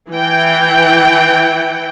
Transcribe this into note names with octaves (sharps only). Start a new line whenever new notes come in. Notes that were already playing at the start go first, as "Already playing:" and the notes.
E3 G5